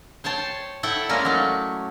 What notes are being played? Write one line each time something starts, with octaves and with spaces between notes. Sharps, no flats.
C5 C#5 G5 A5
E4 A4 E5 F#5 G5
G#3 A#3 C#4 D5 A#5
F#3 A3